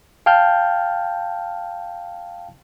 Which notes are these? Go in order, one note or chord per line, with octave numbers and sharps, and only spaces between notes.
F5 G5 A5 F6 G6